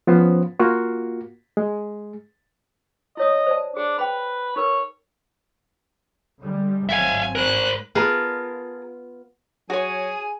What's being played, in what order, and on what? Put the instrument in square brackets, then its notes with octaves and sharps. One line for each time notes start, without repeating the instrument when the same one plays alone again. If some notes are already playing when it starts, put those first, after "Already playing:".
[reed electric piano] F3 B3 C#4 C5
A#3 F4 F#4
G#3
[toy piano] E4 C#5 D#6 [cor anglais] D#5
[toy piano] C5 D5 A5
[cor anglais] D4 [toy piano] G#4
[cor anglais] B4 [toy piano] G5 B5
[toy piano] D#4 A#4 B4 [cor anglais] C#5
[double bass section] D3 G3 G#3
[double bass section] G#1 F#3 C4 [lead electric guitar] E5 F5 [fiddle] G#5
[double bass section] G#2 [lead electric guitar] A#4 C5 [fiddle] F#6
[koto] B3 F4 [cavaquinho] G#4 A#4 A5
[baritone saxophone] F#3 [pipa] F#4 C#5 [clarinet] G#4 [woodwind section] G#5